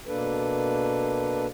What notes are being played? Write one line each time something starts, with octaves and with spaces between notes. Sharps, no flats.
B2 A#3 D4 A4 B4